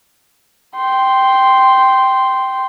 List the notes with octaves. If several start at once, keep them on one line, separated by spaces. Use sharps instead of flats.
G5 C6